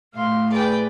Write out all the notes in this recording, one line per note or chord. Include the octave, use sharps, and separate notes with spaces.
A2 F5 C6
G#4 B4 D5 G5